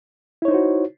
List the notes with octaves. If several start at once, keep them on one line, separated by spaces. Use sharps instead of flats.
D#4 E4 F#4 C5 C#5